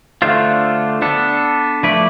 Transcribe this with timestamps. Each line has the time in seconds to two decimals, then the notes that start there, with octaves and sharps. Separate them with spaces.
0.22 D3 A3 D4 F4 C5
1.02 B3 D4 A4
1.83 F3 A3 E4 B4 D5